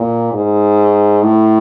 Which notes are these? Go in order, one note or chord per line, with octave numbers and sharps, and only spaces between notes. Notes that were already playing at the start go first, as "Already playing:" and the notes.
Already playing: A#2
G#2
A2